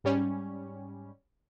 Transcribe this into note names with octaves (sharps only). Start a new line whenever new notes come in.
G#2 G3 C#4